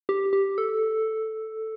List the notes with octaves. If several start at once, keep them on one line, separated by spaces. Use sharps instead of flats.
G4
G4
A4